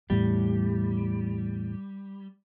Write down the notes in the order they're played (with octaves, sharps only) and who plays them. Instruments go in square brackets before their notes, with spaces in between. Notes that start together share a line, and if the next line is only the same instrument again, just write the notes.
[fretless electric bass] E2 A2 [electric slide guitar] G3